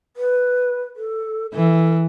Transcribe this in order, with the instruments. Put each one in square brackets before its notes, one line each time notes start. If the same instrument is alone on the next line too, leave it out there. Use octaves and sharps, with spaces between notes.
[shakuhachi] B4
A4
[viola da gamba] E3 [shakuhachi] A4